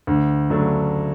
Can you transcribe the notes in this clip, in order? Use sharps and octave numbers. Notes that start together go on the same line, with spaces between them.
D2
C#3 F#3 A3 D4